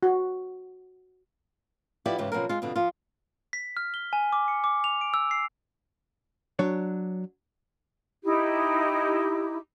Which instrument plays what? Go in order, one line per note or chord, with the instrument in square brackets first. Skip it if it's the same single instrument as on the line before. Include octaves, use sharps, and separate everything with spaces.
[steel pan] F#4
[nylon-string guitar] F3 E4 F#4 G4 B4 D5
G#2 C#3 E3 G4
B2 F3 F#3 C#4 A#4
G#3 F4
F2 B2 D3
F3 F4
[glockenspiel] B6
F6
G7
G#5
D6
C#7
D6
F7
D7
E6
C7
[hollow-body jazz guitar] F#3 D4 C#5
[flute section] D#4 E4 G4